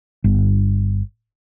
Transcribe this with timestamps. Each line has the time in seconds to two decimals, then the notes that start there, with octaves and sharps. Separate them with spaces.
0.24 G1